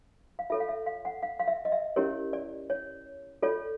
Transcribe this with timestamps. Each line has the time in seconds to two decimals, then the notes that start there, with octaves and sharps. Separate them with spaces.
0.39 F5
0.50 F4 A4 C#5 E5
0.60 F5
0.69 E5
0.86 F5
1.05 F#5
1.23 F5
1.39 F5
1.48 E5
1.65 D#5
1.72 E5
1.96 C#4 E4 G4 A#4 C#5
2.33 D5
2.70 C#5
3.42 F4 A4 C#5 D5